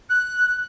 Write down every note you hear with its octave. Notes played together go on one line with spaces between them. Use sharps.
F#6